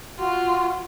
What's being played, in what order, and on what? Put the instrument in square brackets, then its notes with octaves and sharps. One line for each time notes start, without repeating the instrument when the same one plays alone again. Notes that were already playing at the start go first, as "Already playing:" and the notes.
[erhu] F4 [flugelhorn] F#4